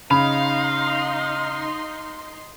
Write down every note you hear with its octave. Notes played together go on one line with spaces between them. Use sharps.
C#3 D#4 F5 B5 C6